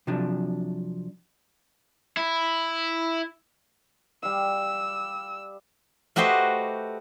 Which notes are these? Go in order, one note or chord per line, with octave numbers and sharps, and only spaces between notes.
C3 F3 F#3 D4
E4
G3 F5 E6
A3 F#4 G4 B4 C5 D#5